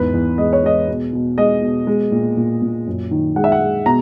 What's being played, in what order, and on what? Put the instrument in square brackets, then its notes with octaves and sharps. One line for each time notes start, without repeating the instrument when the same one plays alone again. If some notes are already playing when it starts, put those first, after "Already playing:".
Already playing: [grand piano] E2 G#2 B4
E2
G#3 D#5
C#5
G#3 D#5
B2
B2
G#3 D#5
B2
G#3
A#2
A#2
A#2
F#2
D#3
G#3 F#5
E5
F#5
G#3
B2 A#5